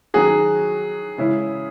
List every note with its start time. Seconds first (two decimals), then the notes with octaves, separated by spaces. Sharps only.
0.14 D#3 F#3 C#4 F#4 G#4
1.18 C#3 E3 G#3 C#4 E4